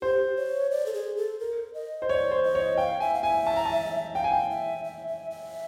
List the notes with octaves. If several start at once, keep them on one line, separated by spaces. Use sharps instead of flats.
G4 C5
C#5
D5
A4
G#4
A4
A#4
D#5
C5
C#5 D5
C5
D#5
C#5
F5 G5
E5 G#5
F5
E5 G#5
A5
A#5
A5
F5 G5
G#5
G5
E5
E5
E5
E5